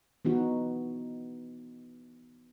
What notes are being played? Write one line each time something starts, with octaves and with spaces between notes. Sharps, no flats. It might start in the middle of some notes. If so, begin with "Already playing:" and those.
E3 B3 D#4 F#4